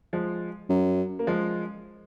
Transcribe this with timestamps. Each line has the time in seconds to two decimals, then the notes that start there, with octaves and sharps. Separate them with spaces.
0.13 F3 G#3
0.70 F#2
1.19 A#3
1.27 F3 G#3